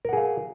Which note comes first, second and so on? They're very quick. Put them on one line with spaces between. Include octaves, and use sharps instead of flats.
A#4 F#5 G#4 F5